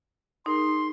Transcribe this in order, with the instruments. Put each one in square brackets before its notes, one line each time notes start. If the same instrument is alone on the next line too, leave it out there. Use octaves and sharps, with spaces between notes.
[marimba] D#4 G#4 A#4 [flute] C6